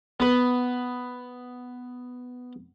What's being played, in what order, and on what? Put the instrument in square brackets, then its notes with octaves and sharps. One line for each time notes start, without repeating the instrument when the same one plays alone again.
[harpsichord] B3 B4